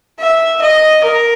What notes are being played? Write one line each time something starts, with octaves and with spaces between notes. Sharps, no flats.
E5
D#5
A#4